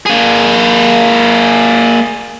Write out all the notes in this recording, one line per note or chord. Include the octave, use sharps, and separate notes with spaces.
A#3 G#4